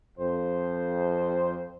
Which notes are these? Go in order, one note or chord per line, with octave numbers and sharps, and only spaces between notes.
F2 C5